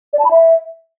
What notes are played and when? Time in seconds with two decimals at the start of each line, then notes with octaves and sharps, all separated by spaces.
0.13 D5
0.19 A5
0.25 B5
0.31 E5